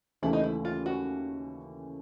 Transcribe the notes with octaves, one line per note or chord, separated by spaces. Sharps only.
D#2 C#3 E3 A3 E4
D#4
E4
F4
F#4